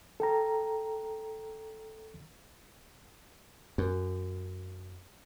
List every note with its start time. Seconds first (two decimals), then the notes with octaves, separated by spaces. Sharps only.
0.20 A4 G5 A#5
3.78 F#2